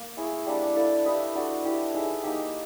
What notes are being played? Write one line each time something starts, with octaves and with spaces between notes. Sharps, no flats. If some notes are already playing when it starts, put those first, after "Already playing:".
Already playing: A#3
E4 G#4 C#5
G3 A#3 D4
E4 A4 D5 F5
E4 G4 B4 D#5
D4 F#4 A4
E4 G4 B4
D#4 G#4 B4 E5
A#3 D#4 G4